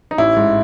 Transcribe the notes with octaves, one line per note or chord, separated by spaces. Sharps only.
D#4
A1 E4
G#2